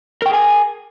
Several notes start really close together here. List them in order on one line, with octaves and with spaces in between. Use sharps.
A#4 G5 G#4 G#5